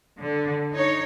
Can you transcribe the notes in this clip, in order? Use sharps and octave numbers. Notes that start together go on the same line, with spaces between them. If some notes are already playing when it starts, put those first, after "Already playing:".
D3
D#4 C#5